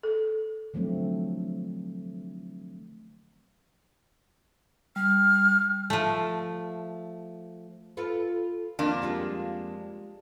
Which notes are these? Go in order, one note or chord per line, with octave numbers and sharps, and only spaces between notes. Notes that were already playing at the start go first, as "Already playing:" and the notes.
A4
D3 F3 F#3 A3 C4
G3 F6
F3 A3
F4 A4 B4
F2 A#3 D4
G3 G#3 F4